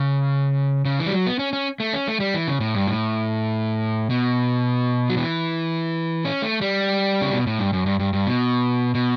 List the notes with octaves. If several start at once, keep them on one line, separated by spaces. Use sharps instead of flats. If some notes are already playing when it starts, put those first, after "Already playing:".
Already playing: C#3
C#3
E3
G3
F#3
B3
C#4
C#4
A3
C#4
A3
G3
E3
C#3
A2
G2
A2
B2
F#3
E3
C#4
A3
G3
C#3
B2
A2
G2
F#2
G2
G2
G2
B2
B2